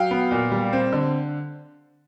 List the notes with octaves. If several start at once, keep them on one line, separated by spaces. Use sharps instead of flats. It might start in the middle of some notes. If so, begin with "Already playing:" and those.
Already playing: F#3 F5 G5
B3
A#2
G3
C4
D3